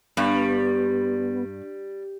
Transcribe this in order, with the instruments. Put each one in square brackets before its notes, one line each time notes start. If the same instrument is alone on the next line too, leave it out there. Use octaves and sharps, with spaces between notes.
[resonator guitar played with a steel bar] G2 [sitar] G3 [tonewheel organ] B3